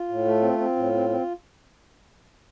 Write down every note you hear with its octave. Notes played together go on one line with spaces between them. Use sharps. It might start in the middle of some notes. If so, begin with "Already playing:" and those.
Already playing: F4
A2
A3
C4
C4
A2
C4
C4